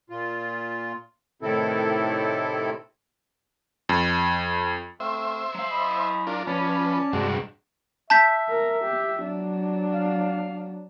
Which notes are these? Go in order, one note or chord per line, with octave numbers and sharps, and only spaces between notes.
A#2 F4
A2 C3 D#3 C4 E4 A4
F2
A3 C4 C5 E5 F5
F#3 F5
D#5 B5
D4 F4 A#4
F3 C#4 B4 D5 A5
G2 C3 G#3 D4 F#4
E5 A5 G6 B6
A#4
G4
F#3 D4
F5